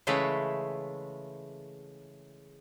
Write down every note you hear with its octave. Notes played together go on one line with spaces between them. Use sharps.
C#3 E3 G#3 A3 B4 C#5